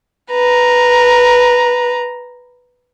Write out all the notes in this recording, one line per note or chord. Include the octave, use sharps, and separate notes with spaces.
B4 A#5